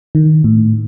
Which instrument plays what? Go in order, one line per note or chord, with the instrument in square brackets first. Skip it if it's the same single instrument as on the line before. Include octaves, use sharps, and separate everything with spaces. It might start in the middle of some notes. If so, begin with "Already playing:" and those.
[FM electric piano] D#3
A2